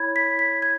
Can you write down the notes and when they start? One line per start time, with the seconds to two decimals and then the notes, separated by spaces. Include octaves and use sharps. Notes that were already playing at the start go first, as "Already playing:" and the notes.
Already playing: E4 C#5 B5 G#6
0.16 B6
0.39 B6
0.62 G#6